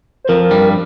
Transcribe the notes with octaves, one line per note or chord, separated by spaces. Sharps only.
C5
F2 F3 A#4
G2 G3